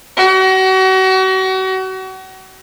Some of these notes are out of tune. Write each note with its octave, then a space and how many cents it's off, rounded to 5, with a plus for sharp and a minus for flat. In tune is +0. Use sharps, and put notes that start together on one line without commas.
F#4 +35